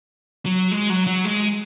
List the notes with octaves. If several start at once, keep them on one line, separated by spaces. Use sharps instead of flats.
F#3
G#3
F#3
F#3
G#3